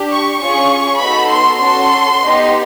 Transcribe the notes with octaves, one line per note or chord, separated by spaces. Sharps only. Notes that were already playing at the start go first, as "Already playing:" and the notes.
Already playing: D4 G4
C#6
C#4 F4 G#4 C#6
B3 D#4 F#4 A4 B5
C6
C#4 F#4 A4 C6
B3 D#4 G4